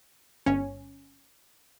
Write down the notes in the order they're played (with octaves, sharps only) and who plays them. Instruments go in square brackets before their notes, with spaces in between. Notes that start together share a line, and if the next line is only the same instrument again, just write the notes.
[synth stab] G1 C#4